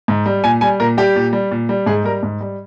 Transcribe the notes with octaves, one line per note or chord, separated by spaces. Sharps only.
G#2
G3
A#2 G#5
G3 G#5
A#2 A#4
G3 G4
A#2
G3
A#2
G3
G#2 G#4
G3 A#4
G#2
G3